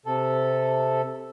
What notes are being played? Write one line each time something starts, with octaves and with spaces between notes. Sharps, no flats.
C3 A4